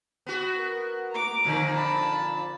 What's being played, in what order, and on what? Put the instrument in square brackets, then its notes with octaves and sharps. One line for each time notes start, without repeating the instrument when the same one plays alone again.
[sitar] B3 F#4
[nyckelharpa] A#4
A#5 D6
[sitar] F2 A#2 D3
[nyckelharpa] A5 B5